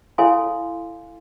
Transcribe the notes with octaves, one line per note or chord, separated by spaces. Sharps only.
E4 A4 C#5 F5 G#5 C6